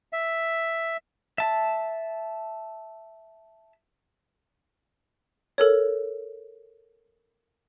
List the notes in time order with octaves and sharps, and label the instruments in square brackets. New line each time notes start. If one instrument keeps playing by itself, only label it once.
[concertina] E5
[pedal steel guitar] E5 A5
[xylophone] A4 A#4 C#5